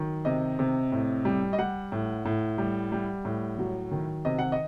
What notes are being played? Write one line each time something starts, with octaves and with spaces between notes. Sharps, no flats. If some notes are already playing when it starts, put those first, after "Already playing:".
Already playing: D#3 F#3
C3 D#5
C3
A2
G3
D#5
G3 F#5
A2
A2
G3
G3
A2
F#3
D#3
C3 D#5
F#5
D#5